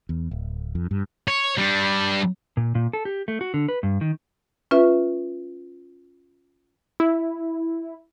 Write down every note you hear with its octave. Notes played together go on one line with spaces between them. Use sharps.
E2
D1
F2
G2
C#5
G3 D4
A#2
A#2
A4
G4
A3
F#4
D3
B4
G2
D#3
C#4 F4 B4 E5
E4